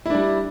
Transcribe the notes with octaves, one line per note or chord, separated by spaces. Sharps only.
G3 D4 E4